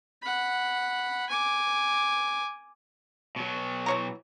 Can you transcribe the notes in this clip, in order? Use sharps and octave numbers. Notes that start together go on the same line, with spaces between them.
F#5 B5
G#5 D6
B2 F#3
E3 C#5 A#5